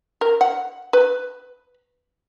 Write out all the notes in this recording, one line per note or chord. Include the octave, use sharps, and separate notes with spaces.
A#4
F#5
B4